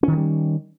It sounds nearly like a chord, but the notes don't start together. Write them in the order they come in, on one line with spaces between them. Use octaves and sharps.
C#4 D#3 F3 G3